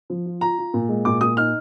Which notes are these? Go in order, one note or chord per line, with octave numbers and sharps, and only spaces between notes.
F3
F4
F4 A#5
F4
A#2
G#3
A#2 D6
A#2 D#6
D#4 F6